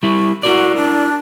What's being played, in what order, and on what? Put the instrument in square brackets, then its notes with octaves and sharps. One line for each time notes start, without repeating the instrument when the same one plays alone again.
[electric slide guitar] G3 E4 [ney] C#6
[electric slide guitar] E4 A#4 D5 [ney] F#4
[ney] D4